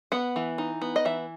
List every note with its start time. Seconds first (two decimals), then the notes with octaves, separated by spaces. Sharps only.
0.12 B3 F#5
0.36 E3
0.58 D#4
0.82 B3
0.96 D#5
1.05 E3 E5